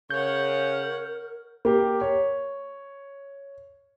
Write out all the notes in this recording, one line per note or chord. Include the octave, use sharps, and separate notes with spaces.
C#3 A#4 C#5 F#5 G6
A#3 G4
C#5